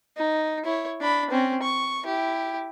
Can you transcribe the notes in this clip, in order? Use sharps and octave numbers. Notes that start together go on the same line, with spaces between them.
D#4
E4 C#5
D4 B5
C4 C#4
C#6
E4 G4